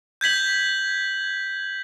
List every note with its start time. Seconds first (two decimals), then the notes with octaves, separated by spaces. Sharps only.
0.21 G6 G#6 B6 F#7